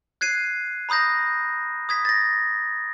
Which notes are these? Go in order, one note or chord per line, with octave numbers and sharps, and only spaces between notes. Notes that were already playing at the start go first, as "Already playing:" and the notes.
F#6 G#6 C7 D#7
A#5 B5 D#6 G6 A#6
D#6 G#6 B6
A6 A#6